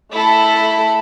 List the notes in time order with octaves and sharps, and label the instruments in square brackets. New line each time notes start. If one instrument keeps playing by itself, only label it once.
[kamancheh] A3 B5 [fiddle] E4 A4